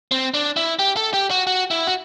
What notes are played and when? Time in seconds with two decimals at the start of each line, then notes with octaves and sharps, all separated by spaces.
0.12 C4
0.34 D4
0.57 E4
0.79 G4
0.97 A4
1.14 G4
1.31 F#4
1.47 F#4
1.71 E4
1.87 F#4